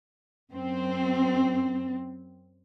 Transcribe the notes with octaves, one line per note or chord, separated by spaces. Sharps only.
F#2 C4